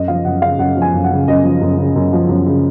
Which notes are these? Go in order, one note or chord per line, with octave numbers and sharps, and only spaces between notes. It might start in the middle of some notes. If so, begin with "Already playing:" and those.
Already playing: F#2 D#5
F3 F5
F#2 F#5
C#3 F5
F#2 F#5
F3
G#5
F#2
F#5
C#3
F#2 D#5
F3
F#2
C#3
F#2
F3
F#2
C#3